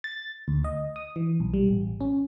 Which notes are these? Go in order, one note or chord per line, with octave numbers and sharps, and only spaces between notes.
A6
D2
D#5
D#6
E3
B1
G3
A1
C#4